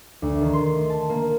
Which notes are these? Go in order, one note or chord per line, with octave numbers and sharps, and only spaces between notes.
D2
D#3
C6
A5
A#3